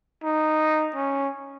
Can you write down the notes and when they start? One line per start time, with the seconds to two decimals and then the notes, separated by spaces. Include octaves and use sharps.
0.23 D#4
0.96 C#4